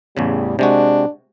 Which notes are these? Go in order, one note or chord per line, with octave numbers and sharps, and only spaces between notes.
A1 E2 C#3 G3
C3 G#3 D4 F#4